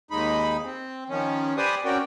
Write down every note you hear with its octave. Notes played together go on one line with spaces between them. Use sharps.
D#2 G#3 D#4 B5
C4
D#3 F3 C#4
G4 B4 C5 D5 G#5 D#6
C4 C#4 F#4 A#4 D5 G5